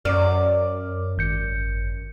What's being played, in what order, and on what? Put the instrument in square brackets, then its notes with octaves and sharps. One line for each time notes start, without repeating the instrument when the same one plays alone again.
[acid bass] F#2 [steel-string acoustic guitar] D5 [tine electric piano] D6 F6
[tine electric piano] G#1 G6 C#7